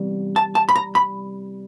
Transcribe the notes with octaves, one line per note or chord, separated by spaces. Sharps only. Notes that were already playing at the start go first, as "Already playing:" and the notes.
Already playing: C3 E3 G3 B3
A5
A5
B5
A#5
B5